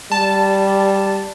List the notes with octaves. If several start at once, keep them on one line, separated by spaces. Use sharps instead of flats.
G3 A5